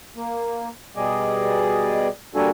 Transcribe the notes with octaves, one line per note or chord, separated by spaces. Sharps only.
A#3
B2 G3 G#4 D5 D#5
G3 A#3 D4 F#4 A4 G#5